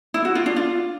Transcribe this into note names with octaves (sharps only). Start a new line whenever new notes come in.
E4
F#4
F4
D4
F4